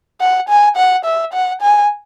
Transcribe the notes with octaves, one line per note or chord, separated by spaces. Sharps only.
F#5
G#5
F#5
E5
F#5
G#5